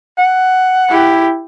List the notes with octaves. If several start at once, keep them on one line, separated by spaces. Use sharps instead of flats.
F#5
E4 G4